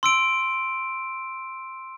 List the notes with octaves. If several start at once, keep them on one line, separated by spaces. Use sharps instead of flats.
C6 E6 D7